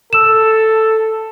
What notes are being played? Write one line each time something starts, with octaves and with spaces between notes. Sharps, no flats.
A4 E6 E7